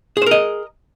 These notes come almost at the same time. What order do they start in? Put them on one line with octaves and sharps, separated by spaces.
G#4 C5 A#4 D#5